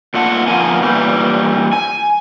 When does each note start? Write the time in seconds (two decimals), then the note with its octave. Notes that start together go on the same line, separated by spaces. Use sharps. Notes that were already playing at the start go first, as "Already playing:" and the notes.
0.14 A#2 A3 F4 F#5 A5
0.47 A#2 F3 A#3 B3 F4 G#5
0.82 A#2 E3 G3
1.73 G#5